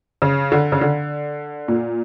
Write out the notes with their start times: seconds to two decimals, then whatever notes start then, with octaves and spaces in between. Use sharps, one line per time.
0.22 C#3
0.52 D3
0.72 C#3
0.81 D3
1.68 A#2